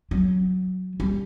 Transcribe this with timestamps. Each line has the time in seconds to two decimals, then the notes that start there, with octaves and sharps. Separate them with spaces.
0.11 F#3
1.00 G3